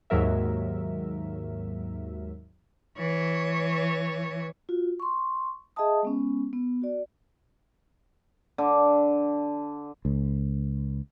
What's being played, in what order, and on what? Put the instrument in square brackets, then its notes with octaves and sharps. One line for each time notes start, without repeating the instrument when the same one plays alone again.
[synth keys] D#2 G#2 F#3 A#4 E5
[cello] E3 C#5
[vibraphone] F4 F#4
C6 C#6
G#4 D#5 E5 G5 A5 D#6
G#3 B3 C#4
B3
F#4 D5
[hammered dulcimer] D3
[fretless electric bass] C#2